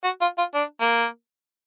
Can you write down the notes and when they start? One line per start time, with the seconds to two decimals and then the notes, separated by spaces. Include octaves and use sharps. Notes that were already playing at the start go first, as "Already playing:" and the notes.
0.04 F#4
0.21 F4
0.38 F4
0.55 D4
0.81 A#3